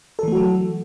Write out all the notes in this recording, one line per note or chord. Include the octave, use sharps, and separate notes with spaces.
E3 F#3 A3 F#4 A4